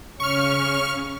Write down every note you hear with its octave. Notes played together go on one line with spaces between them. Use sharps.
C#3 C#4 C#6 F6